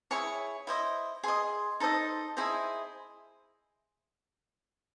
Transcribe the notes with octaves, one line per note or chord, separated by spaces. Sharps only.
E4 G#4 C#5 C#6
E4 C5 D#5
G#4 D#5 C6
D#4 A4 C5 D#5
E4 G#4 C5 D#5